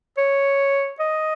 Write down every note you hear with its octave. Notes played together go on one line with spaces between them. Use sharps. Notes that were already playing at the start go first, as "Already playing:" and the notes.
C#5
D#5